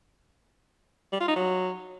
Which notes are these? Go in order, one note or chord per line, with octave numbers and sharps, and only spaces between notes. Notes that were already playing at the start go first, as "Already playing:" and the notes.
G3
F4
D#4
F#3